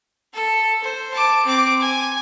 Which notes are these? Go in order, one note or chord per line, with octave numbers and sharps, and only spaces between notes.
A4
C5
A5 D6
C4 D6
G#5